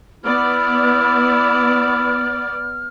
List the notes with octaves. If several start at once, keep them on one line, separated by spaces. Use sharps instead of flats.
B3 E4 D5 F6